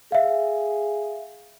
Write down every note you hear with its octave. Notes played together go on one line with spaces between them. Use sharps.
G#4 E5 F5